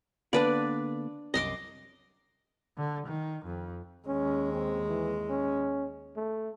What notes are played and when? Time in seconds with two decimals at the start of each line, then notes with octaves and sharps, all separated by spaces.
0.33 D3 A#3 B3 D4 B4 D5
1.34 C2 F#2 D#5 C6 D6
2.77 D3
3.06 D#3
3.45 F2
4.07 D#2 G#3 C#4
4.53 C4
4.88 E3
5.30 C#4
6.16 A3